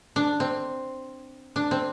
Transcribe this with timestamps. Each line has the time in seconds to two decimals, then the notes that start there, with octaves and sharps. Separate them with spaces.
0.16 D4
0.40 C4
1.56 D4
1.71 C4